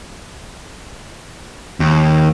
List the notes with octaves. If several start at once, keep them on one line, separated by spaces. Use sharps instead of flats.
D#2